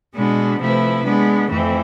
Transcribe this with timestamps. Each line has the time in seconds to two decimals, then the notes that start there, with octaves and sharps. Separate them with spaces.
0.15 B2 G#3 B3 D4
0.60 C3 F3 A3 E4 B4
1.05 G#3 B3 D4
1.49 F2 E3 A3 C4